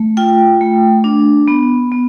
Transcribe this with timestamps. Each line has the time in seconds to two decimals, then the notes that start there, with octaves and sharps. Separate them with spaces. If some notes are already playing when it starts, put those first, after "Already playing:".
Already playing: A3
0.17 F4 G5
0.61 A3
1.04 D4
1.48 B3
1.92 B3